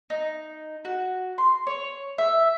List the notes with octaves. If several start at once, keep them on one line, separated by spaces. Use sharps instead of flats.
D#4
F#4
C6
C#5
E5